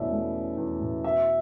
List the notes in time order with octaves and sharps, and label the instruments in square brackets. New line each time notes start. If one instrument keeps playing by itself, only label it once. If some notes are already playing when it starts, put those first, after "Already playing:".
Already playing: [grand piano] E2 B2 A3 C#4 D5 E5
A3
C#4
E2
B2
F#3 E5